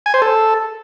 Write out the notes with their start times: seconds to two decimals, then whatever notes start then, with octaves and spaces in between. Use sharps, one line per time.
0.06 G#5
0.14 C5
0.22 A4